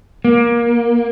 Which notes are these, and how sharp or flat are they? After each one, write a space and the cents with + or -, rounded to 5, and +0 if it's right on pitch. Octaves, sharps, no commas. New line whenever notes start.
A#3 +20